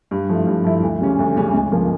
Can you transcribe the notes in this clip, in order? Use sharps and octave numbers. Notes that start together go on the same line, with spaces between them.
G2
F3 A3 E4
G2
F3 A3 E4
D2
C#3 G3 C#4
D2
C#3 G3 C#4
C#2
C#3 F3 A#3